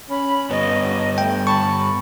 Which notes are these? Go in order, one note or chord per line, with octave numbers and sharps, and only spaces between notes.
C#4 B5
G2 B3 C#5 D#5
A3 G5
A5 B5 C#6